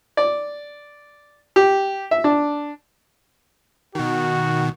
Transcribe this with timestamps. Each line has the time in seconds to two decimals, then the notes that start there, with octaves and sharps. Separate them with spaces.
0.17 D5
1.56 G4
2.11 E5
2.24 D4
3.95 B2 D#3 F#4